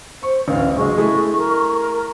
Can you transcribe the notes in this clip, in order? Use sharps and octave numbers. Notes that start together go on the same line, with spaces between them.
C5 C#6
A1 D2 B4 F5
A#1 C#3 F#3 G#3 C#6
A3 E4 G#4
A#4